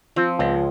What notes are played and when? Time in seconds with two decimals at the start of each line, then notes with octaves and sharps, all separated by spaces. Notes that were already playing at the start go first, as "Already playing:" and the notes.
0.16 F3 C4
0.39 C#2 G#3